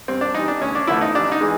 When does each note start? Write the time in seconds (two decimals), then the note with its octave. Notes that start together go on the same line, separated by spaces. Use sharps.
0.08 G2 C4
0.21 D4
0.35 E3 G3 D#4
0.48 D4
0.61 D2 C#4
0.75 D4
0.87 D3 F3 A3 E4
1.01 D#4
1.15 A1 D4
1.32 D#4
1.41 E3 G#3